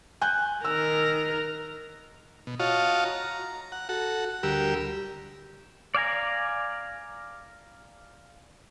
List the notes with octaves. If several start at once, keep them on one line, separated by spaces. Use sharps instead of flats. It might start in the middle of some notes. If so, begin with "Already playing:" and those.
G#5 F#6 G6
D#3 A#4 E6
B2
F4 F#4 C#5 D#5 F5 A5
A#5
F#5
F#4 A4 F#5
D2 G3 G4 A#4 E6
D5 F5 G#5 A#5